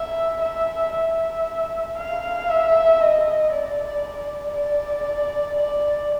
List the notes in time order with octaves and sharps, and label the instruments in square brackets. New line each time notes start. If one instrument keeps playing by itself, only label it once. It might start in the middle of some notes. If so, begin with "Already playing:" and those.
Already playing: [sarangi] E5
E5
E5
F5
E5
D#5
D5
D5
D5